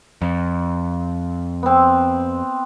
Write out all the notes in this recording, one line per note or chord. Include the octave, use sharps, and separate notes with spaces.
F2
B3 C4